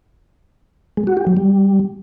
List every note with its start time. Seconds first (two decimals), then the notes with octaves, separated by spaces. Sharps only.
0.97 G#3
1.07 F#4
1.17 G4
1.27 F#3
1.37 G3